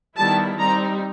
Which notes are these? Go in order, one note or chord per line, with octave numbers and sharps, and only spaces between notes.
D#3 G3 B3 E4 A5
G3 C4 D#4 A#5